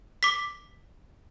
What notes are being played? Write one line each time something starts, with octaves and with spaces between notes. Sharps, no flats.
D6 B6